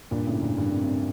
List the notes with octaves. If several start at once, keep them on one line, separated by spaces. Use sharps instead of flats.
G2 A#2
A2 C#3
G2
G2
F2
F2